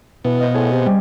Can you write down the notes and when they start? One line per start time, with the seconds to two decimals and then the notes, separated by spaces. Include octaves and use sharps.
0.25 B2 E3
0.39 C5 D#5 F5
0.54 A2 G#4 C6
0.71 C3
0.85 G3 C#4